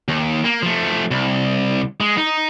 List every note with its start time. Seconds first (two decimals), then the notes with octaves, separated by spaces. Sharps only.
0.08 D#2
0.45 A#3
0.63 F3 A3
1.11 C2
2.01 G#3
2.17 D#4